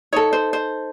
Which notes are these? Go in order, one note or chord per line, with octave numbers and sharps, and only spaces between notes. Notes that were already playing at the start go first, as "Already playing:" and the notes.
D#4 A4 C#5
C5
C5